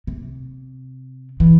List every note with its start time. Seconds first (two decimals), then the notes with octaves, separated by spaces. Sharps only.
0.07 C3
1.40 E3